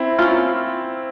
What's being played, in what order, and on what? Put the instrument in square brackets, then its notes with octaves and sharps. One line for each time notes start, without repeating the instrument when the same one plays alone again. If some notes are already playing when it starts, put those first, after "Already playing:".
Already playing: [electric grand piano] C4 E4
[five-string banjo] A#3 C#4 F4